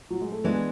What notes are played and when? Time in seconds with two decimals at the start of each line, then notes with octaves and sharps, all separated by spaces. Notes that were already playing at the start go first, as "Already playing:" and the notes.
0.11 F#3
0.21 G#3
0.32 A3
0.44 E3 G#3 B3 D4